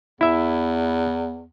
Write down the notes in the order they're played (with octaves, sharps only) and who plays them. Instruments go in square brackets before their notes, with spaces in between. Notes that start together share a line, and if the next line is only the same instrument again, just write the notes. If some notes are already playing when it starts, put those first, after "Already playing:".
[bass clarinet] E2 [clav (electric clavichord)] E4 E5